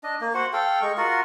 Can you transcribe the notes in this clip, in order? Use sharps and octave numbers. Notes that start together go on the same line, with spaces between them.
D4 D#5
A#3
F#4 C5 F#5
A4 F5 G5
G#3 C#6
F4 F#4 A#4 F#5